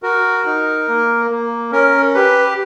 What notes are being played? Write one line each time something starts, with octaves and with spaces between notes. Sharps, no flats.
F#4 A#4
D#4
A#3
A#3
C#4 A#4
G4 B4